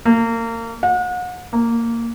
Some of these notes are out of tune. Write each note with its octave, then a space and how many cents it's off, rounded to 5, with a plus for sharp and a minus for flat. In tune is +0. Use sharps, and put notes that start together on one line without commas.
A#3 -30
F#5 -40
A#3 -10